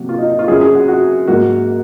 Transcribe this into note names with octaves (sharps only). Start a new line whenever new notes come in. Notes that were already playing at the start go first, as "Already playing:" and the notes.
Already playing: C3 F#3 A#3 F#4
F4
D#4
D#4
F4
F#2 C#3 F#3 G#4
G#4
F#4
F#4
G#2 F#3 A#3 F#4